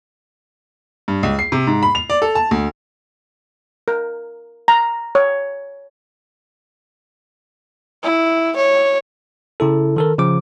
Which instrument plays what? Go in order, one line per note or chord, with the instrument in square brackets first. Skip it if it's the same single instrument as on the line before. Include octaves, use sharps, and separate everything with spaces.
[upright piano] G2
C#2
C7
C3
G#2
B5
F7
D5
A4
A5
D2
[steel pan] A#4
A#5
C#5
[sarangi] E4
C#5
[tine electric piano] C#3 E4 A4
D#3 A4 A#4
C#3 F3 D6